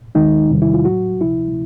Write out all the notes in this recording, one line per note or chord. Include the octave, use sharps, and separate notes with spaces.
D#2 D#3 G#3 D#4
E2 C3 D#3 G3
E4
F4
A2 F#3 F#4
D2 C3 F3 E4